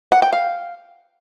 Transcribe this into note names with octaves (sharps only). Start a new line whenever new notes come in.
F#5
G5
F5